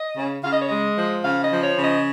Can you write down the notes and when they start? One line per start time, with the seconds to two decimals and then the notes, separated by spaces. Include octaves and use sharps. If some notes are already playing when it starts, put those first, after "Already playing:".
Already playing: D#5
0.17 C#3
0.43 C#3 F5
0.52 D#5
0.61 C#5
0.68 G#3 D#5
0.97 F3
1.24 C#3 F5
1.43 D#5
1.50 F3
1.64 C#5
1.77 C#3
1.84 D#5